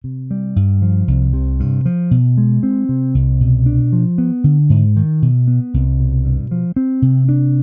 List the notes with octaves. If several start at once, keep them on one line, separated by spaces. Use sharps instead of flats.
C3
G3
G2
F3
C2
C3
G2
F3
B2
G#3
C4
C3
C2
B2
D4
F3
B3
D3
G#2
D#3
B2
B3
C2
B2
G2
F3
C4
C3
D4